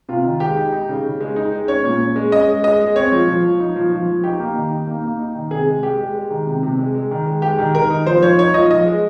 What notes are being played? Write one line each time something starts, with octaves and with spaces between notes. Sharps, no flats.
C3 F4
D#3
G#3 G4
D#4
D#4
C#3
C#3
G#3
D#4
G#3
C#4 C#5
A#2
C#4
G#3
C#4 D#5
G#3
G#3 D#5
G#3
C4 C#5
F3
F3
F3
D#4
F3
F3
F3
D#4 G4
A#3
D#3
D#4
A#3
A#3
D#4
D#3
C3 G#4
G#3
G#3 G4
G#3
G#3
D#3
C3
C3
G#3
G#3
D#3
G#3
G#3 G4
D#3
D#3 A#4
D#4
F3 C5
F3 C#5
D#4 C#5
F3 D#5
F3 D#5
G#3